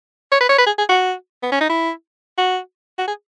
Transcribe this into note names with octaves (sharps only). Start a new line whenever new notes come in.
C#5
B4
C#5
B4
G#4
G#4
F#4
B3
C#4
D#4
E4
F#4
F#4
G#4